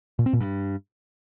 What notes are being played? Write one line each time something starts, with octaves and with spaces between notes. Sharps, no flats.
A#2
C4
A#2
G2